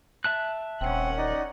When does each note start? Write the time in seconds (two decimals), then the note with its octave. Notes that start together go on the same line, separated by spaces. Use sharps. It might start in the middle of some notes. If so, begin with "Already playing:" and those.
0.24 E5 A5 F#6
0.81 D#1 C4 C#4 F#5
1.18 D#4 D5 D#5